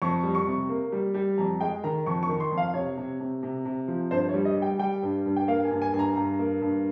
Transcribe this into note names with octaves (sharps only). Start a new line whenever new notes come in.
F2 C#6
G3
C#6
C3
A#3
G3
G3
F2 A#5
G#3 G5
D#3 A#5
F2 C#6
C#6
D#3
C6
F2
F5
C3 C#5
C3
C3
C3
C3
F3
G2 C5
C#5
G3
D#5
G3
G5
G3 G5
G2
G2
G5
A#3 F5
G#5
G2
G#5
G2 G#5
A#5
G2 A#5
A#3
G2